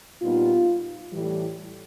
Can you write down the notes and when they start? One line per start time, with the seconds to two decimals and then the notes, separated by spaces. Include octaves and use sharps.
0.21 A#2 G3 B3 D#4 F4
1.12 A2 E3 G3